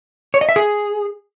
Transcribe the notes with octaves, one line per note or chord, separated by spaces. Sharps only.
C#5
D#5
E5
G#4